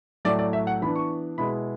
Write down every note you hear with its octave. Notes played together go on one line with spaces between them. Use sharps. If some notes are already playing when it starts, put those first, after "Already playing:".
A2 F#3 A3 D5
D5
E5
F#5
E3 B3 D4 B5
C#6
B2 G#3 B3 E4 B5